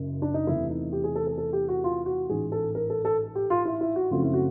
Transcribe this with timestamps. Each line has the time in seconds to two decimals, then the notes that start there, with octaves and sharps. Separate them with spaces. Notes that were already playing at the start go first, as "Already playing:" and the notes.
Already playing: F#1 F#2 C#3
0.22 D4
0.34 D#4
0.47 E2 C3 E3 A3 E4
0.70 D#4
0.93 G4
1.04 G#4
1.16 A4
1.27 A4
1.38 A4
1.53 G4
1.68 F#4
1.84 F4
2.06 F#4
2.29 A1 G#2 E3 G#4
2.52 A4
2.75 A#4
2.90 A4
3.05 A4
3.35 G4
3.50 F4
3.65 E4
3.81 E4
3.96 F#4
4.11 F#2 C#3 F3 A3 C4 F4
4.23 E4
4.33 F#4